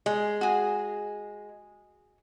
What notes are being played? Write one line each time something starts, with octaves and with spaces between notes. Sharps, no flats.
G#3
F#4 G#4